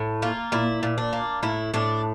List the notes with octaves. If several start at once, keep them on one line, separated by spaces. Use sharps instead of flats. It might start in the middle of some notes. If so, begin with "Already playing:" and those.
Already playing: A2
A#3 F4
A#2 E4
A#2
D4
A#3
A2 E4
A2 D4